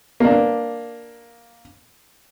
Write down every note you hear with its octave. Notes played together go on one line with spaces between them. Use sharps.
A#3 D4